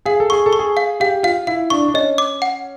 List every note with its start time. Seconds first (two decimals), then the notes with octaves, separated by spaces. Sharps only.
0.06 G#4 F5
0.20 A4
0.30 G#4 C#6
0.46 A4
0.53 C#6
0.59 G#4
0.77 F5
1.00 G4 F5
1.23 F4 F5
1.47 E4 F5
1.70 D4 C#6
1.88 D4
1.94 C#4 D#5
2.18 D6
2.42 F#5